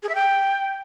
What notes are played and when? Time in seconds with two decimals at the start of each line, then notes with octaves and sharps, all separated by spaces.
0.03 G#4
0.09 E5
0.15 G5